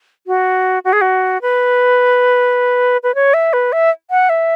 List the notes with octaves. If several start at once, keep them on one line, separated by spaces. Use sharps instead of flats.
F#4
F#4
G#4
F#4
B4
B4
C#5
E5
B4
E5
F#5
E5